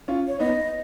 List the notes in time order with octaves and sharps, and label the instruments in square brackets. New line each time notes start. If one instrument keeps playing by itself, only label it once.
[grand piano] C#4 F4
[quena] C#5
[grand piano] B3 D#4 [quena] D#5